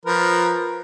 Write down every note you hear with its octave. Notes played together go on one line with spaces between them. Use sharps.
F3 A#4 B4